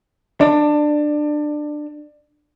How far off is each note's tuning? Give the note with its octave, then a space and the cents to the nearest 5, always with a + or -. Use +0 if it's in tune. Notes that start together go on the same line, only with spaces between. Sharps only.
D4 +20